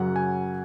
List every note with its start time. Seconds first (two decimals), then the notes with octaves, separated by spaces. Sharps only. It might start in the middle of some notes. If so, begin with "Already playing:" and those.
Already playing: F#2 C#3 F#3 F#5
0.16 G#5